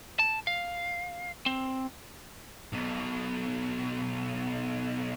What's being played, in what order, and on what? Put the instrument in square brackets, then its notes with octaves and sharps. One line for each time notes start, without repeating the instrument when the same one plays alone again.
[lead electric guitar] A5
F5
C4
B1 B2